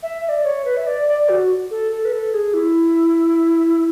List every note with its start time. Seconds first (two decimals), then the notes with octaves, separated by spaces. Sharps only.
0.03 E5
0.24 E5
0.29 D5
0.44 C#5
0.65 B4
0.77 E5
0.87 D5
1.08 D5
1.29 F#4
1.71 A4
1.91 A4
2.05 B4
2.12 A4
2.34 G#4
2.54 E4